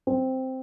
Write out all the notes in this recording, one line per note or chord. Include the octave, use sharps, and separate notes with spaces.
C4